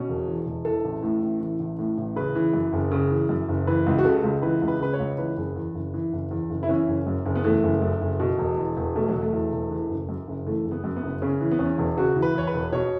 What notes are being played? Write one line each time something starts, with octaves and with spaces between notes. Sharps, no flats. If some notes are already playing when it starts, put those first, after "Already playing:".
Already playing: B2 C#4
E1
E2
E1
E3 A4
A1
A2
A1
E3
A1
A2
A1
C#3 B4
E3
F#2
F#1
C#3
E3
F#2
F#1
E3 B4
C#2
F#4
C#3 A4
C#2
E3 B4
C#2
B4
C#3 B4
C#5
C#2
E3 B4
F#1
E2
F#1
E3
F#1
E2
F#1
E4
E3 C#4
F#1
F#2
F#1
B3
E3 A3
F#1
F#2
F#1
B2
E1
E2
E1
B2 A3
F#3
E1
A3
E2
E1
E3
F#1
F#2
F#1
E3 A3
F#1
B3
F#2
B3
F#1
C#3 C#4
E3
B3
E2 C#4
E1
C#3 F#4
E3
B4
E2 C#5
B4
E1
B2 C#5